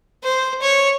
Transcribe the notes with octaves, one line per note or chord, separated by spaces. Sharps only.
C5
C#5